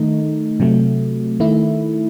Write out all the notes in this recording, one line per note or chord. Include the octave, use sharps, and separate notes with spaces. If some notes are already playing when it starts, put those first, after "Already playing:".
Already playing: D#3 A3 D#4
C3 F#3 A3
D#3 A3 E4